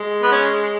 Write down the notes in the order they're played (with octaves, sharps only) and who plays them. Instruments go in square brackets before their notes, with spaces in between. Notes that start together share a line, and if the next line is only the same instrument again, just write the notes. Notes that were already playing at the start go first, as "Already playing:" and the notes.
Already playing: [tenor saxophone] G#3
[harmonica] B3
C#4